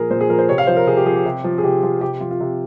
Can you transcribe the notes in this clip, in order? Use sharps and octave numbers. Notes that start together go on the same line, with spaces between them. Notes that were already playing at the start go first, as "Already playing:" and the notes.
Already playing: A#2 F3 G#4 A#4
A#2 C5
G#4
F3 A#4
C5
C3 C#5
F5
F3 C5
A#4
C3 G#4
G4
F3 G#4
G4
C3
F3
G#4
C3 G4
F3 F4
C3 G4
F3 F4
F4
C3